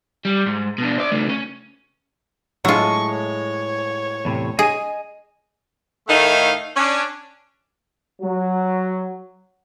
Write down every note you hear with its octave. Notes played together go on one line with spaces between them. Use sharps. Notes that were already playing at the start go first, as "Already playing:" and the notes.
G3
G#2
B2 D4
C5 D5
C#3 A3
C#4
A2 F#3 G#3 F4 C#6
C#5
E2 A2 C3
G#4 D#5 G#5
A2 D#3 A3 D#4 E5 F5
C#4 D4
F#3